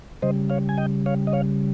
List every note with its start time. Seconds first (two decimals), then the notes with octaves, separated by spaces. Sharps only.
0.22 C#3 G3 C5 D#5
0.50 C#5 F5
0.69 G#5
0.78 D#5 G5
1.06 C#5 F5
1.27 D#5
1.33 C#5 F5